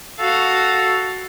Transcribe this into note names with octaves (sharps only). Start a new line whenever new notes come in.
F#4 A4 F5